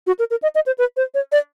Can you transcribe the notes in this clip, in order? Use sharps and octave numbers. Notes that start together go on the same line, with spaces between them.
F#4
A#4
A#4
D#5
D#5
C5
B4
C5
C#5
D5